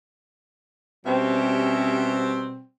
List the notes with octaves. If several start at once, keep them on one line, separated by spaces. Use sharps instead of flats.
B2 G3 C4 C#4 G4 E5